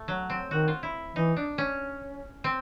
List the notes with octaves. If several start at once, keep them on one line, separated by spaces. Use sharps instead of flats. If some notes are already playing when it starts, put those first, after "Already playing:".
Already playing: A3
F#3
C4
D#3 F#4
F4
E4
E3 D#4
D4
C#4
C4